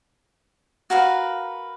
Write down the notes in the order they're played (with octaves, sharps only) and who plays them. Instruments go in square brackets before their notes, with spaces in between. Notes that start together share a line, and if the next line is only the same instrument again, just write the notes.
[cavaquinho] F#4 A#4 B4 F5